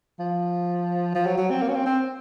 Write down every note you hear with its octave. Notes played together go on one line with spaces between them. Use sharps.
F3
F3
F#3
F#3
C4
A#3
C#4
C4
C4